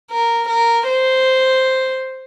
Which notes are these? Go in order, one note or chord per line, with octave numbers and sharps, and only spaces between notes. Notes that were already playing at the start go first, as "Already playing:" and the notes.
A#4
A#4
C5